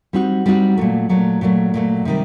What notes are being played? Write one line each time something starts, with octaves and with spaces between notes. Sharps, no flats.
G3 C4 D#4 F#4
G3 C4 D#4 F#4
A#2 F#3 A3
A#2 F#3 A3
A#2 F#3 A3
A#2 F#3 A3
C3 D#3 G3